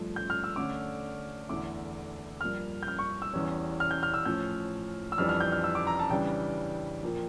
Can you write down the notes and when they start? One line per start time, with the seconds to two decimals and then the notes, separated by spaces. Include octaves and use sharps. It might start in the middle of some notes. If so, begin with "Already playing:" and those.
Already playing: G2 F3 A3
0.16 G6
0.30 F6
0.44 E6
0.56 D3 A3 C#4 D6
1.48 E2 D3 A3 E4 D6
2.41 G2 F3 A#3 F6
2.83 G6
2.88 F6
2.99 C#6
3.22 E6
3.34 E2 E3 G3 C#4
3.80 F6
3.91 G6
4.03 F6
4.14 E6
4.25 A2 F3 C#4 G6
5.12 E6
5.18 F2 E3 G3 D4 F6
5.29 F6
5.41 G6
5.52 F6
5.64 E6
5.75 D6
5.87 A#5
5.99 A5
6.10 C#3 E3 G3 D4 G5
7.03 A#2 F3 A#3